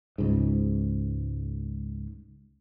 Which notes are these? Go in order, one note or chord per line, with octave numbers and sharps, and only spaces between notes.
C#2 G#2